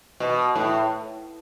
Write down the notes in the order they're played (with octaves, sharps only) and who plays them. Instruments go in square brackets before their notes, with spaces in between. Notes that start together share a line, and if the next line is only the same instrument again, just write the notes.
[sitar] B2
A2